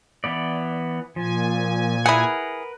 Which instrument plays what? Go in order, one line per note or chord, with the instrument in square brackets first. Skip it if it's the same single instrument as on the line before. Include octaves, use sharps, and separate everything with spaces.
[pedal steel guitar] E3 B3 D5
[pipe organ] A#2 G#5 [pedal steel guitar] F3
[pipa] E4 G#4 [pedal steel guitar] A#4 B4 F#5